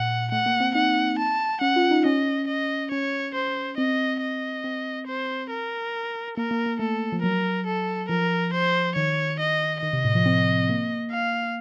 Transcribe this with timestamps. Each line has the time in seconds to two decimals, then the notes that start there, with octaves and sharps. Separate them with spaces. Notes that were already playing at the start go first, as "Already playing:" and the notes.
Already playing: A#2 F#5
0.32 A3 F#5
0.46 A#3
0.60 C4
0.75 D#4 F#5
1.19 A5
1.61 C#4 F#5
1.76 F4
1.91 D#4
2.05 C#4 D#5
2.48 D#5
2.91 C#4 C#5
3.34 C5
3.78 C4 D#5
4.21 D#5
4.64 C4
5.07 C5
5.51 A#4
6.37 A#3 A#4
6.51 A#3
6.66 A#3
6.79 A3 A4
7.12 F3
7.23 F#3 A#4
7.66 A4
8.09 F3 A#4
8.53 C5
8.95 D#3 C#5
9.39 D#5
9.82 D#3 D#5
9.93 C3
10.04 A2
10.15 F3
10.26 C4
10.69 A#3
11.11 F5